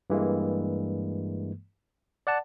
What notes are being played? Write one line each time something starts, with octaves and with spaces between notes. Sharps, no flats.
G2 E3 G#3 A#3
D5 F#5 A5